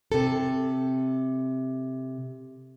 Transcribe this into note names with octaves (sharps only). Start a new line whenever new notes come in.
C3 A4